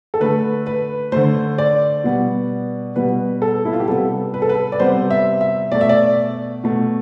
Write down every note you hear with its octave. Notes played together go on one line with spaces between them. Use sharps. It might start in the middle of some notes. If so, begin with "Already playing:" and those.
A4
D3 A3 B4
B4
D3 A3 C5
D5
B2 G3 B3
B2 G3 B3 B4
A4
E4
F4
G4
C3 G3 B3 A4
B4
A4
B4
D5
C3 G3 B3 C5
E5
E5
B2 A3 D5
E5
D5
B2 A3